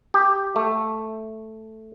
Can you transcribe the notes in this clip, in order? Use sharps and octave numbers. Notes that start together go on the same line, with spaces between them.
G4
A3